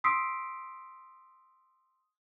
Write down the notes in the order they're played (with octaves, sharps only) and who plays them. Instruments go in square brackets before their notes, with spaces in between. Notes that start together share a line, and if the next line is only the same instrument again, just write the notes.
[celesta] C6 D#6 E6 B6 C7 D7